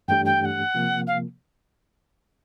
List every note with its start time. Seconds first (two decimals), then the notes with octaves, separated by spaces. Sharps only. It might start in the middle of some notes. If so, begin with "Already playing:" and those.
0.08 G2 E3 A3 D4 G4 G5
0.25 G5
0.41 G5
0.45 F#5
0.74 C3 F3 A#3
1.07 F5